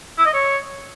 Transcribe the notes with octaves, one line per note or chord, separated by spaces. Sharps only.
E4
D#5
C#5